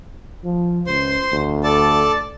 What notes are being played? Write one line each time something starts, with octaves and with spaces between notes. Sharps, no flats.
F3
C#2 C5 C6
D2
A4 D5 A5